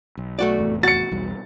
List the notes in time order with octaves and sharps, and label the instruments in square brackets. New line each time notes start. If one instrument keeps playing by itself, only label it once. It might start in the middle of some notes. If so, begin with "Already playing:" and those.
[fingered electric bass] B1
[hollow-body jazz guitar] A3 F#4 D5
[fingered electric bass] F1 E2 A2
[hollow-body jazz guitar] F#4 [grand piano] A6 C#7
[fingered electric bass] B1 E2 G3